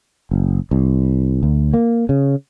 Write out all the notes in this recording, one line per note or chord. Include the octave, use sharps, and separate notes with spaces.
F#1
C2
D2
A#3
C#3